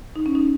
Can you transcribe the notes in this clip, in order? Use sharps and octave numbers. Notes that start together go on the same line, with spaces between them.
D#4
C#4
D#4